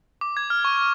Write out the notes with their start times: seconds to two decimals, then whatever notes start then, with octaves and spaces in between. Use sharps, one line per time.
0.21 D6
0.37 G#6
0.50 F6
0.65 C#6
0.77 C#6